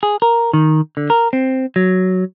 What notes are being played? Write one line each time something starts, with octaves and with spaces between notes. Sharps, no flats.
G#4
A#4
D#3
D3
A#4
C4
F#3